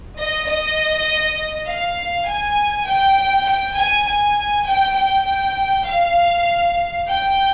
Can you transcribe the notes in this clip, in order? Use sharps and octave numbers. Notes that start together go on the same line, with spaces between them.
D#5
D#5
F5
G#5
G5
G5
G#5
G#5
G5
G5
F5
G5